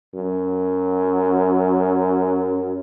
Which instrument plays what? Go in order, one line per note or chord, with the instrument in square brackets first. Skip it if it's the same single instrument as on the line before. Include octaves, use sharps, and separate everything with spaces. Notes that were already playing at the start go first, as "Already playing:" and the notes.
[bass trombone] F#2